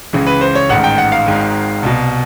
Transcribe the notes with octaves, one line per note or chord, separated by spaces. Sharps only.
C#2 C#3 E3
B4
C5
C#5
A1 G#2 D#3 F#5
G5
F#5
F5
G#1 G#2 D#3
C2 B2